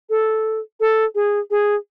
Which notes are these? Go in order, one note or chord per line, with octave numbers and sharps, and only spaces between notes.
A4
A4
G#4
G#4